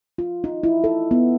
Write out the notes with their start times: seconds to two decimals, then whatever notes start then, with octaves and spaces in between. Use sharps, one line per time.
0.18 F4
0.44 D#4
0.64 E4
0.84 A4
1.11 B3